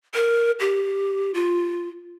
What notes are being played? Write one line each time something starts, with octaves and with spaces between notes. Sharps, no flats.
A#4
G4
F4